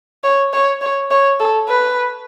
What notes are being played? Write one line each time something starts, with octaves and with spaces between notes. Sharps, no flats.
C#5
C#5
C#5
C#5
A4
B4